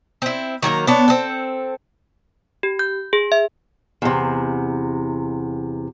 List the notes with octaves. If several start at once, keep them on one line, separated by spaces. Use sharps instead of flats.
C4 E4
D#3 F#3 A#3 A#4
B3 D4 C#5
C4 A4
G4
G6
G#4
E5
E2 C3